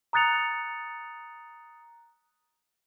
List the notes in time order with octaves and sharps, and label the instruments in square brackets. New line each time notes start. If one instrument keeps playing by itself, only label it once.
[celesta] A#5 D#6 F#6 A6 C#7 F7